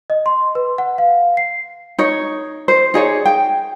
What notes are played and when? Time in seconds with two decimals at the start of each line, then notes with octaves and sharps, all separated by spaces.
0.10 D#5
0.26 C6
0.55 B4
0.78 F#5
0.98 F5
1.37 C7
1.98 D#4 C#5
2.68 C5
2.94 D#4 G#4 C#5 D5
3.25 G5